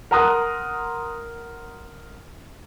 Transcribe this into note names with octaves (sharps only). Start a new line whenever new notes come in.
A#4 F#5 A#5 C6 D#6 F#6